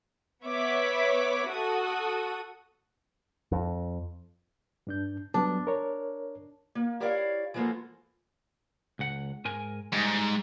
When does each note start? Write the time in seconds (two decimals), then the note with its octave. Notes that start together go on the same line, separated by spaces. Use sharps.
0.45 B3 C#5 E5 B5 D6
1.48 F#4 A4 D#6
3.52 F2
4.87 G2 D4 G6
5.34 F#3 G3 B3 D4
5.67 A#4 C#5
6.75 A#3
7.00 E4 G4 A#4 C#5 D5 F5
7.54 E3 F3 G#3 A#3 F#4 A4
8.99 C#2 F#5
9.45 G#2 A#4 G#5
9.93 G#2 G3 D#4